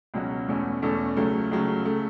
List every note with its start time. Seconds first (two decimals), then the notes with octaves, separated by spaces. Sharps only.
0.14 C#2 B2 F#3 C#4 F#4
0.48 E2 B2 A3 C#4 A4
0.82 E2 B2 A3 C#4 A4
1.17 C#2 C#3 F#3 A3
1.51 C#2 C#3 F#3 A3
1.85 C#3 A3